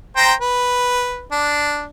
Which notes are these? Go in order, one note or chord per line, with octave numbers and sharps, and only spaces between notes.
C5 G5 A#5
B4
D4